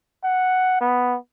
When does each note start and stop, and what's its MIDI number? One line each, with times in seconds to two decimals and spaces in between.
0.24 0.78 78
0.81 1.17 59